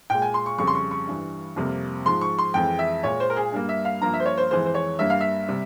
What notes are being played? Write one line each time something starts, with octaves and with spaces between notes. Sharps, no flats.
A#2 G#3 G5
G#5
C6
C#6
F2 C#3 G3 C#6
C6
C#6
C#6
G2 E3 G3
F2 C3 G3 A#3
G#2 F3 G#3 C6
C#6
C6
F2 E3 G#3 G5
E5
A#2 G#3 C#5
C5
A#4
G#4
G2 G3 A#3
E5
F5
G2 F3 A#3 A#5
E5
C5
C#5
C5
F2 E3 G#3 C5
C5
C#5
G2 G3 A#3 E5
F5
E5
C3 G3